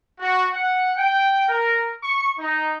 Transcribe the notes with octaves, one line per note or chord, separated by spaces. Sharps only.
F#4
F#5
G5
A#4
C#6
D#4